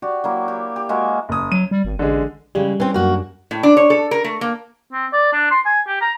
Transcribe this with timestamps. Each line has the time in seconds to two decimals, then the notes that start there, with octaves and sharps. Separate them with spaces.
0.02 F#4 G4 D5
0.24 F#3 A#3 E4
0.48 G4
0.76 G4
0.89 G#3 A#3 F#4 E5
1.29 F#1 D#6
1.52 F#3 D#7
1.71 G3
1.85 G#1
1.99 A1 D3 G#3
2.55 C#3 E3 G3 G#3
2.80 E3 C4 C#4
2.94 F#2 A#3 D4 F#4
3.51 A2
3.63 D4
3.77 C#5
3.90 A4
4.11 A#4
4.24 A3
4.41 A#3
4.93 C4
5.13 D5
5.33 D4
5.51 C6
5.65 G#5
5.88 G4
6.01 A#5